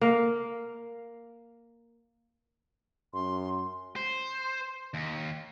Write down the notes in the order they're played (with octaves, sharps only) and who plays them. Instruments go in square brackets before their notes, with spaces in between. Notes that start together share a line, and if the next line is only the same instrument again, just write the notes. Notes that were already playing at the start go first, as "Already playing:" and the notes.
[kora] A#3 F5
[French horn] F#2 [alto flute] C6
[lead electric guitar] C5
D#2